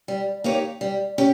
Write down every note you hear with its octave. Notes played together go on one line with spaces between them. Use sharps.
G3
A#3 D#4 G4 C#5
G3
C#4 G4